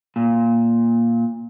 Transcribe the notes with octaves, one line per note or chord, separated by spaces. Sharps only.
A#2